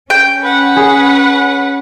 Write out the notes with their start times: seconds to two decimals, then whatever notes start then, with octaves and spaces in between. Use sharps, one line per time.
0.10 C#4 G5
0.43 B4 F#5
0.76 G#4 B5